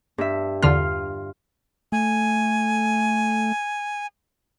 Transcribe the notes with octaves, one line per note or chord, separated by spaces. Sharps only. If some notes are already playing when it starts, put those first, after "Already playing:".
G2 E5
E2 D3 F4 F6
A3 G#5